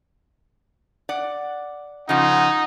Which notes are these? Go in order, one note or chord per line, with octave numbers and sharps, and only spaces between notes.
D5 F#5
C#3 F3 D#4 F#5